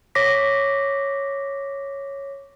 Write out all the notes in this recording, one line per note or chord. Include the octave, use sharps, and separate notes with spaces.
C#5 D6 A#6 B6